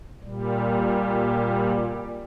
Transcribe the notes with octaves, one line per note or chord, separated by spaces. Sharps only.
A#2 G3